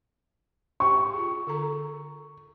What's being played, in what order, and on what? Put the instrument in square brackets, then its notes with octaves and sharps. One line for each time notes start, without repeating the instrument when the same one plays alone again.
[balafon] G4 C5 G5 [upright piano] C#6
[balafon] F4 G#4
D3 A4 A#5